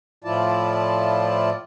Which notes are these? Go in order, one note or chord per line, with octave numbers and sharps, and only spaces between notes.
A2 F3 E4 F4 D5 A5